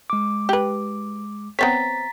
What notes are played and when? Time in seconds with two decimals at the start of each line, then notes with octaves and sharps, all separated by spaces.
0.10 G#3 D6
0.49 G4 B4
1.59 B3 C4 C#5 A#5 A6 B6